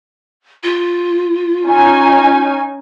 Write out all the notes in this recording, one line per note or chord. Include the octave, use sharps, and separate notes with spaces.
F4
C#4 D#4 G#5